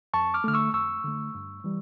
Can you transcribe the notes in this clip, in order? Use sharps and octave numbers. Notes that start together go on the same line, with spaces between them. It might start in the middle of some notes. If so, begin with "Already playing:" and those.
F2 A5 C#6
D6 F6
D3 A3 F6
C#6 E6
F2 C#6 E6
D3 A3
G2
E3 G3